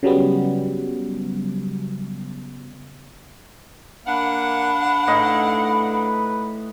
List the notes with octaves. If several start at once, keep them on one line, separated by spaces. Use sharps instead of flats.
C#3 F#3 G3 B3
A#3 D4 F5 F#5 B5
A2 D#4 B4 D#5